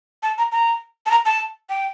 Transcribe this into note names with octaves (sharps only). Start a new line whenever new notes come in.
A5
A#5
A#5
A5
A#5
A5
G5